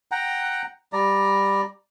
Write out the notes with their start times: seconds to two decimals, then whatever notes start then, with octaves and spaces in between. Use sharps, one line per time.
0.11 F#5 G5 A#5
0.93 G3 D5 A#5